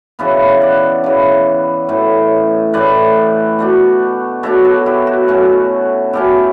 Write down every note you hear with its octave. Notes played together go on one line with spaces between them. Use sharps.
C#3 E3 B3
D5 F#5
C#3 E3 B3
A2 E3 A3
A2 E3 A3 B4 D5
B2 A3 D4
B2 A3 D4 A4 C#5
F#4 A4
E4 G4
F#4
B2 A3 C#4 F#4
B2 A3 C#4 E4 G4